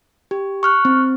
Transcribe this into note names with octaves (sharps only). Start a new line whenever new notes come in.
G4
C#6 F6 F#6
C4